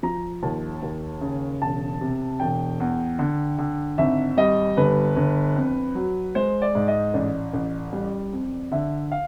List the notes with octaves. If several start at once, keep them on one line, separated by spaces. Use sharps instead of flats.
F3 A#5
D#2 A5
D#2
C#3
E1 A5
C3
E1 G5
E2
D3
D3
G#1 E5
G3 D#5
G1 B4
G1
F2
F#3
G#3 C5
D5
G#2
D#5
A1 D5
A1
G3
F2
D3 E5
F5